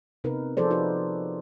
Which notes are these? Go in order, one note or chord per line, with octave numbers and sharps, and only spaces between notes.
C3 B3 D#4 A#4 B4
F3 F4 G#4 A4 C5 D5
D#4 F#4 A4 B4